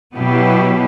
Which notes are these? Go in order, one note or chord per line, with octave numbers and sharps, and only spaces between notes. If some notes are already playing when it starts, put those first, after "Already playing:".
B2 F#3 B3 E4 G4